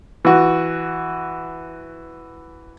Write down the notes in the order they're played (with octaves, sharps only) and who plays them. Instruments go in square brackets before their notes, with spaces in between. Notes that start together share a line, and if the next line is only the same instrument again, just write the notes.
[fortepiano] E3 F#4